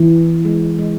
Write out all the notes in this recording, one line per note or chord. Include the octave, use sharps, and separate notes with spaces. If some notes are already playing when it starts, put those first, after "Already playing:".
Already playing: E3
G#3
G#3